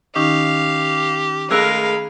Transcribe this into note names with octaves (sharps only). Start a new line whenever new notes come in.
D#3 C#4 D#4 G4 F5
G#3 A3 G#4 A#4 F5 B5 E6 F#6